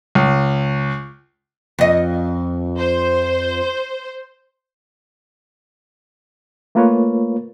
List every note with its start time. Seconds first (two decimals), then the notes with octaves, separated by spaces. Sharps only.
0.15 C#2
1.79 F2 D#5
2.76 C5
6.75 A3 A#3 F4 A#4 B4 C#5